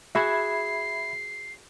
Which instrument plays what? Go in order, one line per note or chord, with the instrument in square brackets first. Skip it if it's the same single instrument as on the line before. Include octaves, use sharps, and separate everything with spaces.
[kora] F#4 G#4 [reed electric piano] E5 B5 G#6 [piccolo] C7